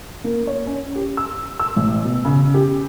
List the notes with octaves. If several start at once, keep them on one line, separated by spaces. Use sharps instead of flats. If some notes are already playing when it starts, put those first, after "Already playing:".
A#3
C#5
C#4
G4
E6
E6
A1
B2
C#3
G4